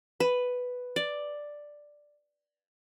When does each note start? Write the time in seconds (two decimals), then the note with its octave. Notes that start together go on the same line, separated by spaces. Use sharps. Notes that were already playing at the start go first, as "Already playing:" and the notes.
0.20 B4
0.96 D5